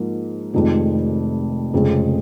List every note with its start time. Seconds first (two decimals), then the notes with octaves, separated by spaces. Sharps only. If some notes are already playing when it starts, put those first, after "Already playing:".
Already playing: G#2 F3 A#3
0.54 F1 F2 C3 D#3 G#3
1.73 F1 F2 C#3 G#3 C4